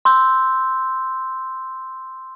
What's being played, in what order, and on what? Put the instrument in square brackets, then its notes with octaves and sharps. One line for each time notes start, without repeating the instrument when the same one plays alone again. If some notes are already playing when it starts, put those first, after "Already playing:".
[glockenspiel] C6 E6 G6